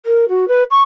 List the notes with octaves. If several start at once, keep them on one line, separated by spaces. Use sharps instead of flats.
A#4
F#4
B4
C#6